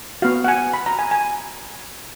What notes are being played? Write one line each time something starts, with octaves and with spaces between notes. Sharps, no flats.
B3 F#4 F5
F#5
G#5
B5
A#5
G#5
G#5